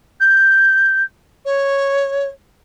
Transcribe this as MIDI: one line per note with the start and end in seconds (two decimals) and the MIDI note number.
0.20 1.03 91
1.45 2.29 73